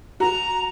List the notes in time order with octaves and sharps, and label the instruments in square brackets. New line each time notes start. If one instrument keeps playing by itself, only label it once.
[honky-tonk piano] F#4 [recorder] A#5